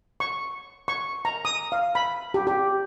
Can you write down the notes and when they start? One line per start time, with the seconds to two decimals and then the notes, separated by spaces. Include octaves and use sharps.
0.20 C#6
0.88 C#6
1.25 A#5
1.45 D#6
1.72 F5
1.95 B5
2.34 G4
2.47 G4